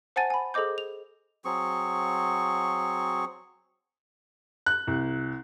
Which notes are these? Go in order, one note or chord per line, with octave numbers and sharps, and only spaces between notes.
C5 F#5 G#5 A5 A6 D#7
G#5 B5
G#4 A4 C5 D#5 D6 G6
F7
F#3 C4 G#4 C#6
F#6
C2